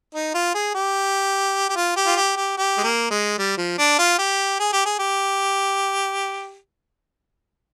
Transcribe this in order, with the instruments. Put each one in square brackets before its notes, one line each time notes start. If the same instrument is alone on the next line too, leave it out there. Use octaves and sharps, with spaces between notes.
[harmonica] D#4
F4
G#4
G4
G4
F4
G4
F4
G4
G4
G4
G#3
A#3
G#3
G3
F3
D4
F4
G4
G#4
G4
G#4
G4